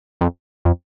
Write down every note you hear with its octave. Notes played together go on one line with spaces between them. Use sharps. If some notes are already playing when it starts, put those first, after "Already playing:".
F2
F2